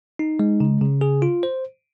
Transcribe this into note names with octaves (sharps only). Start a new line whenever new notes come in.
D#4
G#3
C#3
C#3
G#4
F4
C5